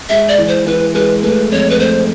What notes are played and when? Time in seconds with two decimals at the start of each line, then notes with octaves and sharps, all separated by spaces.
0.09 G#3 E5
0.28 D5
0.38 E3
0.48 C5
0.66 E3 B4
0.95 G#3 B4
1.23 A3 B4
1.51 F2 C#5
1.70 B4
1.80 A3 C5